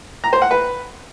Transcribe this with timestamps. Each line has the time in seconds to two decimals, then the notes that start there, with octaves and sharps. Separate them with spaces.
0.24 A#5
0.33 C5
0.42 F#5
0.51 B4